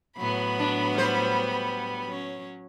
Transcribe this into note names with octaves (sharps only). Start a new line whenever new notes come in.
A2 F#3 B3 B5
D4
G3 C5
F#3 C#4